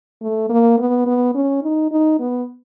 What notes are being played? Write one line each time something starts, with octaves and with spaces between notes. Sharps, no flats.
A3
A#3
B3
B3
C#4
D#4
D#4
B3